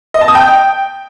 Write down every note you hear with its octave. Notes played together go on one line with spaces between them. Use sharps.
D#5
A5
D#6
G5